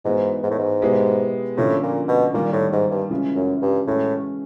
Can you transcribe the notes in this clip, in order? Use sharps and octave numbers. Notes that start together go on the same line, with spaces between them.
G#2 E3 G#3 B3 D#4 F#4
G#2
A2
G#2
B2 G#3 B3 E4 G4
A2 D3 F3 A#3 C#4
A#2
B2
A#2 D#3 G3 A#3
A2
G#2
G2
C#3 E3 G#3 C#4 F4
F#2
G2
A2 E3 G#3 C#4 F#4